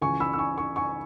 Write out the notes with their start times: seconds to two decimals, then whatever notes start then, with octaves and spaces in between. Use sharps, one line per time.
0.01 C#2 C#3 E3 G#5 C#6
0.20 B5 E6
0.34 E6
0.39 G#5 C#6
0.58 G#5 C#6
0.76 G#5 C#6